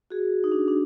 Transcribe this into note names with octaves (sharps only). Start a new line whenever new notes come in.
F#4 G#4
D#4
D4
D4